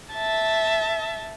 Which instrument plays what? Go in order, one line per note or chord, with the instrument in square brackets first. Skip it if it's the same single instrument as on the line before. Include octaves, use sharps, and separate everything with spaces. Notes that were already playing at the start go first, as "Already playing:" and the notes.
[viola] E5 A5